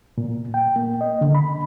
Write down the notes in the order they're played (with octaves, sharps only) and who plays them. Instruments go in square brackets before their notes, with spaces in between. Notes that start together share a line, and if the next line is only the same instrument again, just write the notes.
[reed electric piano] A#2
G5
A#3
D#5
D3
B5